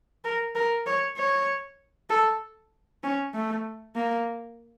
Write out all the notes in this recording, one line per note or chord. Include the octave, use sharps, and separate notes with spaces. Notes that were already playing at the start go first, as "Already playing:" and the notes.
A#4
A#4
C#5
C#5
A4
C#4
A3
A#3